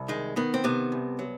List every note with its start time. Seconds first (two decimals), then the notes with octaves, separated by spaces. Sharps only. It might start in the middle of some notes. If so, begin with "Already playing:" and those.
Already playing: C2
0.08 D#3 G#3
0.36 D#3 B3
0.54 C4
0.64 C3 B3
0.92 C2
1.19 F#3